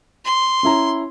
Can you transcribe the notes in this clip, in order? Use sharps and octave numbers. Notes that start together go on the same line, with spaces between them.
C6
C#4 E4 A#5